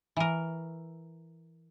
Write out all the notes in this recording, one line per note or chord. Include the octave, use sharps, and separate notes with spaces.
E3 A#4